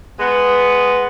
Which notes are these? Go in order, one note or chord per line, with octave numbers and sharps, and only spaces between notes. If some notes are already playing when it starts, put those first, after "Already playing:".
G#3 B3